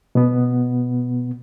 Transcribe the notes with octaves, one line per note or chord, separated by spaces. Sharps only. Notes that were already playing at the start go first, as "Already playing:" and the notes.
B2 B3